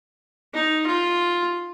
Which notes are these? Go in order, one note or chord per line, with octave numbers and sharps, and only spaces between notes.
D#4
F4